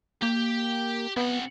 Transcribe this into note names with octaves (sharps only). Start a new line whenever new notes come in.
A#3 G4
C3 B3 F#5